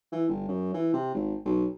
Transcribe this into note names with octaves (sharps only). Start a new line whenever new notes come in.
E3
G1
F#2
E3
C3
G#1
B1